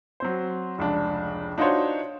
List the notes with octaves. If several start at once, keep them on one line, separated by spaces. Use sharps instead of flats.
F#3 C4 C5
F1 C#2 D4
D4 D#4 F4 F#4 C5 C#5